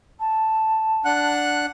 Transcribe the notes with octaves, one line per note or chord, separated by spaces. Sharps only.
A5
D4 F#5 F#6